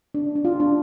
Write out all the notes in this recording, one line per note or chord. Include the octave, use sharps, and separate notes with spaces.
D4
D4
F4
D4